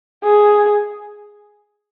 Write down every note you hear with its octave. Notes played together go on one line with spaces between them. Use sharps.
G#4